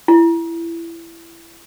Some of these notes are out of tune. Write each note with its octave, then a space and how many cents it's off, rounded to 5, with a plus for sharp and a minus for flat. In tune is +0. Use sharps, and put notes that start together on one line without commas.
E4 +20